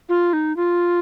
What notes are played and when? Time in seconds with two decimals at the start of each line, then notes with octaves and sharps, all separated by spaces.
0.09 F4
0.33 D#4
0.57 F4